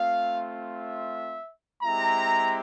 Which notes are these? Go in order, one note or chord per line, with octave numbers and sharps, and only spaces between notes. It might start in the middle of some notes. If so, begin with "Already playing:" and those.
Already playing: A3 C4 F4 F5
E5
G#3 C4 E4 G4 A#5